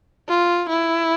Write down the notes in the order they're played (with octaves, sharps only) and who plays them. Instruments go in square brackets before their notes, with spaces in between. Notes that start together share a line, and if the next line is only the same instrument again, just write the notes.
[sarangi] F4
E4